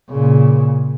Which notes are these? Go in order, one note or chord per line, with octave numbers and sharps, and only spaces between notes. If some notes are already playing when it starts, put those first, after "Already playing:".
A#2 C#3